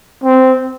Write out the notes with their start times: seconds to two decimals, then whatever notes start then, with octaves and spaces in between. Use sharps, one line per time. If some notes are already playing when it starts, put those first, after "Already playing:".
0.24 C4